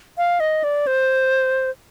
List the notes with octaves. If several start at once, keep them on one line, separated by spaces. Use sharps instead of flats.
F5
D#5
D5
C5